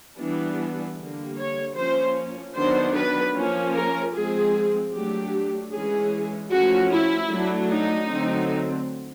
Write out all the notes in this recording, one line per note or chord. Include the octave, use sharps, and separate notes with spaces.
E3 G3 B3 D4
D3 G3 A#3
C#5
F3 A#3 C#4 C5
D#3 F#3 B3 D4 C5
B4
F3 A#3 C#4
A#4
F3 G#3 C4 G#4
F#3 A3 D4 G4
E3 G#3 C#4 G#4
F3 A3 C#4 F#4
E4
F#3 A3 D4
D#4
D3 F#3 A3 C4